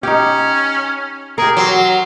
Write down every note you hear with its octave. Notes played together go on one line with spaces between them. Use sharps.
C#4 D#4 G4
G4 G#4 A#4
F#3 C6